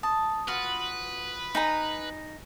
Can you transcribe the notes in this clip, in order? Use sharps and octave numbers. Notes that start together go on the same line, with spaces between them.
A5 D#6
F4 F#4 B4 F6
D#4 G#5 A#5 B5